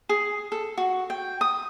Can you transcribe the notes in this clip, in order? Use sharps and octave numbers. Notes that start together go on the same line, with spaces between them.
G#4
A4
F#4
G5
D#6